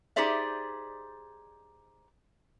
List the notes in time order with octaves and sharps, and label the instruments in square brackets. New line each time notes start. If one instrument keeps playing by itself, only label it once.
[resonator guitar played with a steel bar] D#4 G4 G#4 C5 D5 E5